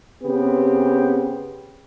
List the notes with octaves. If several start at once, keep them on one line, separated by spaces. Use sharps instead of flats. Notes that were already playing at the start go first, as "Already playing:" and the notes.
C#3 B3 C4 G4